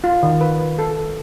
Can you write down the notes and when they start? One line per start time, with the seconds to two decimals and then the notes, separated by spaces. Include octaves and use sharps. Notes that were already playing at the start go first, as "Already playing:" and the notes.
0.04 F4
0.23 D#3
0.41 B4
0.79 A4